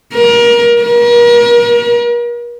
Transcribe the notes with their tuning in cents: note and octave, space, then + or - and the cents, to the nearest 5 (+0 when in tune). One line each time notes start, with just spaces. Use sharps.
A#4 +30
A#4 +40